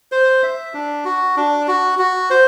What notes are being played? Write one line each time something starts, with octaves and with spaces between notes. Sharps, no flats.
C5
E5
D4
F#4
D4
F#4
F#4
C5